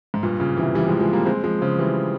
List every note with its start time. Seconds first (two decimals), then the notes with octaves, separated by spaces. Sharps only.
0.14 G#2
0.23 G2 A#2
0.40 A#2 C#3
0.57 C3 E3
0.75 E3 G3
0.88 F3 G#3
1.00 F3 G#3
1.13 G3 A#3
1.26 G#3 C4
1.44 F3 G#3
1.61 C#3 F3
1.79 E3 G3